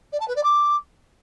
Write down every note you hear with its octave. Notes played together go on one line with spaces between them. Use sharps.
D5
A5
B4
D5
D6